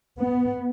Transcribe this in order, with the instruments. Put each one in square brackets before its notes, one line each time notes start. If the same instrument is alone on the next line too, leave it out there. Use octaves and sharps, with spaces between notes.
[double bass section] B3